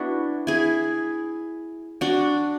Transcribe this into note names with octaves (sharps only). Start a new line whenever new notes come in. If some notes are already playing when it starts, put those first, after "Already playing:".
Already playing: B3 D4 E4 F#4
E4 G#4
D4 F#4